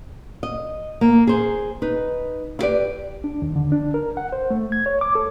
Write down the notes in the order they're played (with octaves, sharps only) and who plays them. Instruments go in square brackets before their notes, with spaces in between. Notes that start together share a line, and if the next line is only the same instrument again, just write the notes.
[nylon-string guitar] D#5
A#3
G#4 C5
D#4 B4
E4 G4 B4 D5
[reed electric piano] D4
D#2
D3
D4
A#4
F#5
C5
A3
G#6
C#5
D6
A4